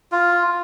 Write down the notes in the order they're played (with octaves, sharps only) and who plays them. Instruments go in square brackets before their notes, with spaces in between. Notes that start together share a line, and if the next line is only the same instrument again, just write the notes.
[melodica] F4